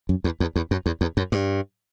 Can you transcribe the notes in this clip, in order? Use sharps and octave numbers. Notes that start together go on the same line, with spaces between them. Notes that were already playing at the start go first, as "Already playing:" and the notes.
F#2
E2
E2
E2
F#2
E2
E2
F#2
G2